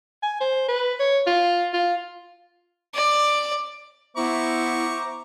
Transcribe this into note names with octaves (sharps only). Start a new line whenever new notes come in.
G#5
C5
B4
C#5
F4
F4
D5
B3 E4 C5 E5 A#5 C#6 D6